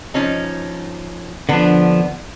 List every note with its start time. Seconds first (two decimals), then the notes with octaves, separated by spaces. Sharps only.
0.14 F3 C#4 D#4
1.49 D3 F3 B3 D4